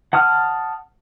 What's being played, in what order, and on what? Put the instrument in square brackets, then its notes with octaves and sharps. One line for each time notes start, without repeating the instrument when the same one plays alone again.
[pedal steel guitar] F#5 A5 D#6 F6